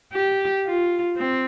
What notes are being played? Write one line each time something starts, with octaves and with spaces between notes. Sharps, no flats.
G4
F4
C4